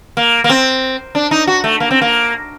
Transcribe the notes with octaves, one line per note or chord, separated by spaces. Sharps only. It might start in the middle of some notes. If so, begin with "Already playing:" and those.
A#3
A#3
C4
D4
D#4
F#4
A3
A#3
C4
A#3